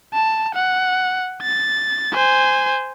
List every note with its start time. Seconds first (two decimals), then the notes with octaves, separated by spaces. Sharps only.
0.14 A5
0.55 F#5
1.43 A6
2.13 C5 G#5